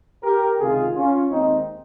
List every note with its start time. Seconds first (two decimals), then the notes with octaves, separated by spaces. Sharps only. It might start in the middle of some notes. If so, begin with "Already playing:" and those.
0.24 G4 A#4
0.59 C#2 C3 D#3 F4 G#4
0.96 C#4 F4
1.32 D#2 D#3 G#3 C4 D#4